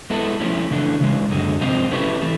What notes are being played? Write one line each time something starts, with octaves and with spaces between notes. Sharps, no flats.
G#3 B3 E4 A4
F3 A3 C#4 E4
C#3 E3 A3 D4
C#3 E3 G#3
F#2 D3 G#3
C3 F3 G#3 C4 F4
A3 C#4 E4 G4 B4
E3 A3